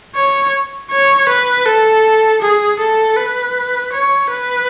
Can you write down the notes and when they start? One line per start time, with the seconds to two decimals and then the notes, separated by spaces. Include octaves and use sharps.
0.15 C#5
0.91 C#5
1.29 B4
1.66 A4
2.42 G#4
2.80 A4
3.17 B4
3.93 C#5
4.30 B4